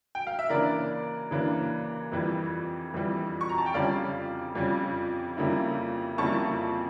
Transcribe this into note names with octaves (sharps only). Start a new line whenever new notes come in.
G5
F5
E5
C#3 E3 A#3 D4 A#4 D5
C#3 E3 A#3 D4
F2 E3 G3
F2 E3 G3
C#6
A#5
A5
G5
F2 C#3 G3 C#4 D5 F5
F2 C#3 G3 C#4
F2 C#3 G3 A#3 E4
F2 C#3 G3 A#3 E4 A5 C#6